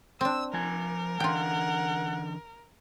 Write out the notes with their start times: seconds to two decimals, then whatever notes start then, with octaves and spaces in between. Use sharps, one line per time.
0.21 C4 D4 E6
0.53 F3 A#4 G#5
1.20 D3 E3 F4 F#5 G5